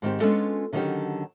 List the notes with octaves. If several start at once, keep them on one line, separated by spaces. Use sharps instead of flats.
G#2 D#3 C4 G4
G#3 B3 C#4 D4 F4 A4
D3 D#3 F#3 C#4 D#4 G4